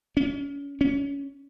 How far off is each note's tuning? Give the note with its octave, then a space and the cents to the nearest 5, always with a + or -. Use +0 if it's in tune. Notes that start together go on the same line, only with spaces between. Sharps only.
C#4 +30
C#4 +20